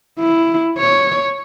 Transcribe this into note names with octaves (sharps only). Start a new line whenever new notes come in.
E4
C#5